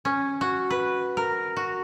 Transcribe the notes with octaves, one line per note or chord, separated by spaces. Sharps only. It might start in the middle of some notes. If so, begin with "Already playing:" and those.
C#4
F#4
B4
A#4
F#4